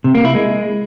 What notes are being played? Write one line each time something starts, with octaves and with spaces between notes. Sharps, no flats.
C3
A#3
E4
G#3